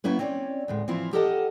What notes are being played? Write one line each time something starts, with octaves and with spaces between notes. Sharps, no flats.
F#3 A#3 C#4 E4 B4
C4 C#4 C#5 D5
D2 A2 G#3
E3 F3 C4 E4 F4
G4 A4 A#4 D#5 F#5 A5